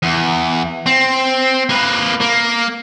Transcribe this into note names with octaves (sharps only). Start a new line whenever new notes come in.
E2
C4
A#3 B4
A#3